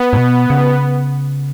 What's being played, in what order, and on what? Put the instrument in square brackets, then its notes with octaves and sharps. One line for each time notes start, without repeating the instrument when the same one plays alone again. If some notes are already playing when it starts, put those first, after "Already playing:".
Already playing: [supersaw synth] B3
[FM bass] G#2
B2
C#3